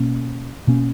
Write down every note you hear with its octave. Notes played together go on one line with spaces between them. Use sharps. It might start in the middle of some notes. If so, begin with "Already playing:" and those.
Already playing: B2 A#3 C#4
B2 A#3 C#4